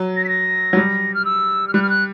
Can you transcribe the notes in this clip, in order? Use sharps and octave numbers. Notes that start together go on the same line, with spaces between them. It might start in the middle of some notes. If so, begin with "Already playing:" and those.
Already playing: F#3
A#6
B6
A#6
F#3
G3
F6
E6
F6
G3 F#6
F6
F#6